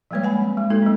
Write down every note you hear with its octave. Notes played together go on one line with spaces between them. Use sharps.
F3 G3 G#3 A#3 B4 C#5
F#5 G#5 B5
C4
G#3
G#3 A#3 D#4 F#4 A4
F#3 A#3 C4